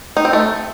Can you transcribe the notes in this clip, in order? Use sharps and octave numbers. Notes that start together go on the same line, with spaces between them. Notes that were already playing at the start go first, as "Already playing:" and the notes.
D#4
C4
A3